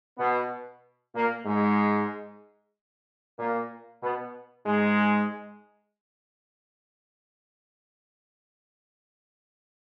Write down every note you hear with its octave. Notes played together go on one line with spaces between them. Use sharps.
B2 B3
A#2 A#3
G#2 G#3
A#2 A#3
B2 B3
G#2 G#3